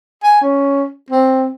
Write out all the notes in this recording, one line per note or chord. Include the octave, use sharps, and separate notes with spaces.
G#5
C#4
C4